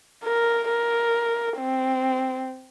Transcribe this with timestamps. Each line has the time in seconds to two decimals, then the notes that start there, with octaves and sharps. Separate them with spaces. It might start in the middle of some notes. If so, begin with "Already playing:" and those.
0.24 A#4
0.69 A#4
1.58 C4